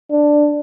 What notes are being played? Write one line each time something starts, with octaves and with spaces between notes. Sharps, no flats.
D4